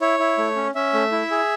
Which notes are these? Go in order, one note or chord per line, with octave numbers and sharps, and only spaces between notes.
E4 C#5
E4
A3
C#4
C#4 E5
A3
E4
G#4